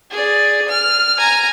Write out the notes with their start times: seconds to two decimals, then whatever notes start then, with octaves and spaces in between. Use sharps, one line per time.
0.11 G#4 D5
0.69 F6
1.17 G#5 A#5